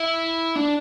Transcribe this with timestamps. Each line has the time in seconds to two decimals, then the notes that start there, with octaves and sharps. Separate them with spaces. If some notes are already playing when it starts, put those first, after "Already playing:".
Already playing: E4
0.56 D4